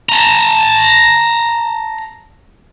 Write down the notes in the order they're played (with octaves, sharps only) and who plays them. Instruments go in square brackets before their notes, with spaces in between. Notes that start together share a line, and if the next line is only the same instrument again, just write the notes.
[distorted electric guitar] A5 A#5